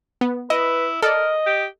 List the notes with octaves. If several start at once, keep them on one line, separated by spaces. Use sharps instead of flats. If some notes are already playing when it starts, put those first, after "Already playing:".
B3
E4 B4 D#5
A4 A#4 D5 D#5
G4